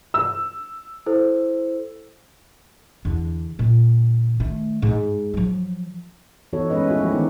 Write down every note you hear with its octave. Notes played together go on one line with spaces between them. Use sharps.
E6
E4 A4 C5
E2 D3
A#2 D3
D#3 A3
G#2
F3 F#3
E3 B3 D#4 F#4 A4 C#5
G#3 A3 C#4 B4 D#5
E4 F#4
F3 G#3 A3 G4
D#3 E3 B3 D#4